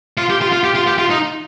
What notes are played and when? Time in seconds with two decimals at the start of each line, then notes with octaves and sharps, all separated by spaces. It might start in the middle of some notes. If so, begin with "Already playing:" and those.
0.18 F4
0.30 G4
0.41 F4
0.52 F4
0.64 G4
0.75 F4
0.87 G4
0.98 F4
1.10 D#4